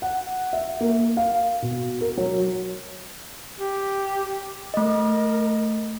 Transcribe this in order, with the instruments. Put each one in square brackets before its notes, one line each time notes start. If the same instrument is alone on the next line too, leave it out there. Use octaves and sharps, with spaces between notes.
[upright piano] F#5
E5
A#3
F5
B2
A#4
F#3
[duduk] G4
[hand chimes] A3 D#5 [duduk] A#4